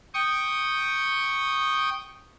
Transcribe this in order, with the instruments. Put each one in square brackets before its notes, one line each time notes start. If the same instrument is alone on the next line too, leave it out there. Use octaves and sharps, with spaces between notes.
[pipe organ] G5 C#6 D#6